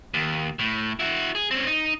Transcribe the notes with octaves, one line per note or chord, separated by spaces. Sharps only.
D#2
A2
E4 F#4
G#4
C4 C#4
D#4